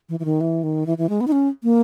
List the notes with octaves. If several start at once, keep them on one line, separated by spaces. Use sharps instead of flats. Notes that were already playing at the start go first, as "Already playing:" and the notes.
E3
E3
D#3
E3
D#3
E3
E3
G#3
B3
D#4
C#4
A#3